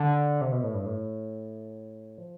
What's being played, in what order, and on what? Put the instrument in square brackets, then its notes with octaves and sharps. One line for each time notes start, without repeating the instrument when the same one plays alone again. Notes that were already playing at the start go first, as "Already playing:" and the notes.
Already playing: [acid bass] D3
C3
B2
A2
G2
A2
F3